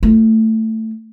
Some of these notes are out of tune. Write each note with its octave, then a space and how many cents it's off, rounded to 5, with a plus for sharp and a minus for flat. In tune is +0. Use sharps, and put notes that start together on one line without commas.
A3 +15 F4 -25